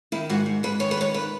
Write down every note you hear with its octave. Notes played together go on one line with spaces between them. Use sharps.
D#3 E4
G#2 F#4
G#2
G#2 B4
D#3 C#5
B4
G#2 C#5
D#3 B4